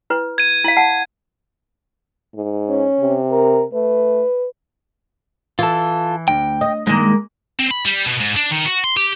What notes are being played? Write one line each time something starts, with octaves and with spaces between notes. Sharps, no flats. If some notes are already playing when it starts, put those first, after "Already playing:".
E4 B4
G#6 D#7
E4 F5
F#5 A5
G#2
C#4
C3
A#4
A3 B4
E3 F4 A4
D2 G5
D#5
G2 D#3 G#3 A#3
C4
B5
G3
B2
G#2
D4
D#3
F#4
C6
G4